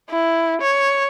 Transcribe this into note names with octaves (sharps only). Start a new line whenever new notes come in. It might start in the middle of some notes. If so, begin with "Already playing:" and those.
E4
C#5